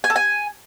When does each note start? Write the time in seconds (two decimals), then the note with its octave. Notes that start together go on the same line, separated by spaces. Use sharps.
0.04 G#5
0.10 A4
0.16 G#5